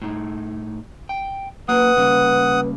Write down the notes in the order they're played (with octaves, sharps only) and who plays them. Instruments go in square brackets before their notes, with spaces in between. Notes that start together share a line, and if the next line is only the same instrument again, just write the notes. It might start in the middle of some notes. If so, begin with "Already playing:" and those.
[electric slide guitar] A2 D#4
G5
[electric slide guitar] F#3 A#3 [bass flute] B4 [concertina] F#5 D#6
[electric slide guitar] C#3 G3 A#3